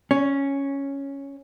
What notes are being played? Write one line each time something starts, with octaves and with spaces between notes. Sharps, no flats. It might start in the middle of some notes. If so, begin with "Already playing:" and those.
C#4